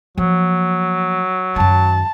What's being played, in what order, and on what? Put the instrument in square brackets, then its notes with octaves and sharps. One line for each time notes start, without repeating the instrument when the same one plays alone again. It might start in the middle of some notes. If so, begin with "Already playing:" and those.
[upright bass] F3 A#3 [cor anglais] F#3
[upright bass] F#2 D#3 [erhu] A5